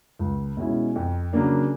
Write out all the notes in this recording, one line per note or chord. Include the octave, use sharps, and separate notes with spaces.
C#2
B2 G#3 C#4 E4
F2
C#3 F#3 A#3 D4